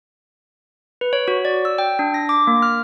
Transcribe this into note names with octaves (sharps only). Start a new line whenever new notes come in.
B4
C#5
F#4
D5
E6
G5
D4
A#6
D6
A#3
F6